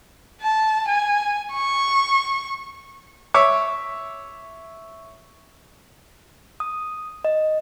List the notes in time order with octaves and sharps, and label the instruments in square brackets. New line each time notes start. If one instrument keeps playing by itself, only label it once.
[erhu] A5
G#5
C#6
[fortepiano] C#5 E5 D6
[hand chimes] D#6
D#5